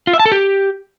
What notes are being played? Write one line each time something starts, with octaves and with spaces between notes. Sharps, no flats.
F4
E5
A5
A4
G4